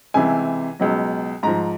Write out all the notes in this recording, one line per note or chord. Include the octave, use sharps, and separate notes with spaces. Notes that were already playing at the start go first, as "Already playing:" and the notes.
C#2 C3 E3 G#5
C#2 B2 F#3
G#2 F3 A#5